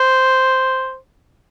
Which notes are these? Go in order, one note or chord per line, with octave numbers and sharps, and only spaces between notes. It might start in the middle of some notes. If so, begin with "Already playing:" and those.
Already playing: C5